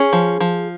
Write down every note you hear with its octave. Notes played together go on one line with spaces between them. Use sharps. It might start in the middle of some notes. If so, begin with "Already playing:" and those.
Already playing: C#4 G#4
F3
F3